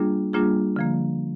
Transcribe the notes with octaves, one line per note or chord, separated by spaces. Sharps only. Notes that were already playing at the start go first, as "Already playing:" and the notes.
Already playing: G3 A#3 D4 F4 G#4
G3 A#3 D4 F4 G#4
D3 F3 A#3